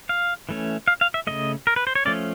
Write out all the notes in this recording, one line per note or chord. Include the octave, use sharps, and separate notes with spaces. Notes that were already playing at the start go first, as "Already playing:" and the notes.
F5
E3 A3 C#4
F5
F5
E5
C#3 F3 A3 D#5
A#4
B4
C5
C#5
F3 A3 C#4 D5